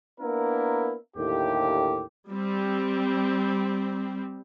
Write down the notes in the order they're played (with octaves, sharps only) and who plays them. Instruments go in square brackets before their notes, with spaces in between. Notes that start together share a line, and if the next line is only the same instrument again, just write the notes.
[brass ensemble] A#3 B3 D4 E4 A#4
D#2 A2 D3 G4
[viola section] G3 C4